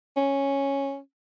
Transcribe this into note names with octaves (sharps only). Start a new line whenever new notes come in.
C#4